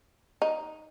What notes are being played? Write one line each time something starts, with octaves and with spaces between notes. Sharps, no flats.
D#4